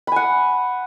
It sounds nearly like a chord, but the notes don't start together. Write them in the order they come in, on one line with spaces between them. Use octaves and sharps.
B5 G#5 F#5